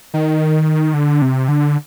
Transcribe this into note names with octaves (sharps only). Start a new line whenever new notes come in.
D#3
D3
C3
D3